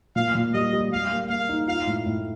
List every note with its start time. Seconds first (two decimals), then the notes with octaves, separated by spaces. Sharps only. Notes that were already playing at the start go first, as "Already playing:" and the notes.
0.15 A#2 F5
0.35 A#2
0.54 G3 D#5
0.73 G3
0.92 G3 F5
1.11 A#3
1.29 A#3 F5
1.49 D#4
1.68 F4 F5
1.87 A2
2.06 A2